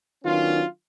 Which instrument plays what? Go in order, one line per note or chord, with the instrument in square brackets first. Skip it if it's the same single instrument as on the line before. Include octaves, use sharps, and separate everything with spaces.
[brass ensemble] D#3 F#3 B3 C#4 D4 F4